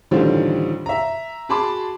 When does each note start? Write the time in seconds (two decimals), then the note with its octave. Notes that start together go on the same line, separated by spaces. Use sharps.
0.11 A1 D3 D#3 G3 F4 C5
0.86 E5 A#5
1.49 F#4 G#4 A5 B5 C6 D6